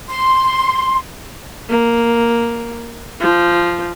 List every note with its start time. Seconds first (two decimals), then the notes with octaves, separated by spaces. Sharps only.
0.08 C6
1.69 A#3
3.20 F3